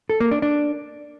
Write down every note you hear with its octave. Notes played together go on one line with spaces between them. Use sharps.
A4
A#3
D4
D4